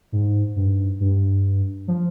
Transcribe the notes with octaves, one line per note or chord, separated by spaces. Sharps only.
G#2
G2
G2
F3